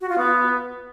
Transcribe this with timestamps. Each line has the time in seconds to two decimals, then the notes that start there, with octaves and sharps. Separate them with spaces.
0.01 F#4
0.09 F4
0.18 B3